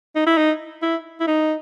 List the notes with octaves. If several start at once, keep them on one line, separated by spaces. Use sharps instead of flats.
D#4
E4
D#4
E4
E4
D#4